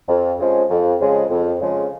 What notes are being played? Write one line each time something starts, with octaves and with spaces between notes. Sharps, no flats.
F2
C#3 F3 G#3
F2
C#3 F3 G#3
F2
C#3 F3 G#3